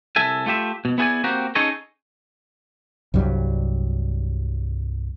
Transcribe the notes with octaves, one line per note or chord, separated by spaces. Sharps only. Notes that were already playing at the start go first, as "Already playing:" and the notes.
C2 A4 E5 G#5
A3 F4 G4 E5
B2
B3 E4 G#4 C5 D5 G#5
A#3 C4 F#4 G4 A#5
C#4 D#4 G#4 A4 C#5 D#5
C2 G2 F#3 G3